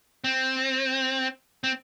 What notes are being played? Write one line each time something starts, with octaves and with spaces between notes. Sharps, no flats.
C4
C4